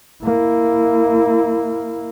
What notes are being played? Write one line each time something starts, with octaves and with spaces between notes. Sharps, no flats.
A#3 E4